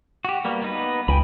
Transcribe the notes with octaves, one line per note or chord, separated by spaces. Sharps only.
F#4 G4
G3 A#3 B3
B3 D#4 B4
C#2 G5 G#5 B5